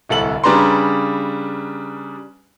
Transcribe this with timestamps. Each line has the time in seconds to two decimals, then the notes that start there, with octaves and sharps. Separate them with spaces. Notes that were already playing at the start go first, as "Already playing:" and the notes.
0.09 D1 C2 A4 F#7
0.44 C#3 G3 D4 B4 A#5 C6